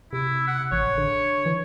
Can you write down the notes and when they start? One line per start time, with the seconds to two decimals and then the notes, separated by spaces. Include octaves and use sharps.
0.13 C3 E4
0.48 F#5
0.72 A1 C#5
0.97 D3
1.46 E3